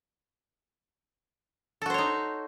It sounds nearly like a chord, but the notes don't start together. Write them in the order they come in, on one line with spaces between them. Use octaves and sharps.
A4 F#4 C5 C#5 D#4